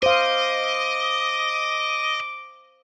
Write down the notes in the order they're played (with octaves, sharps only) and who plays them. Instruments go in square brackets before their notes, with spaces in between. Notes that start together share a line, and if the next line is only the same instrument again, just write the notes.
[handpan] C5 F5 [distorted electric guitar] D#5 [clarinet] D6